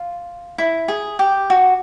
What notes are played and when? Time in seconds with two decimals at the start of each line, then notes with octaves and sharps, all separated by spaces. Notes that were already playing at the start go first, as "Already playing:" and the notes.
Already playing: F4
0.58 E4
0.88 G#4
1.19 G4
1.50 F#4